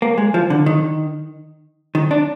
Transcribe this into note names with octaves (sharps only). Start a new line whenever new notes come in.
A#3
G#3
F3
D3
D#3
D#3
D4